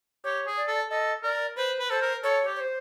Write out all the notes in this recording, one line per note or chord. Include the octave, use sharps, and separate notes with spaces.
G4 C#5
G#4
D5
A4
A4 D#5
A#4 D5
B4 C5
B4
A4 C5
A#4
A4 C#5
G4
C#5
C5